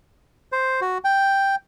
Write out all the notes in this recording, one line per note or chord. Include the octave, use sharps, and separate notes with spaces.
C5
F#4
G5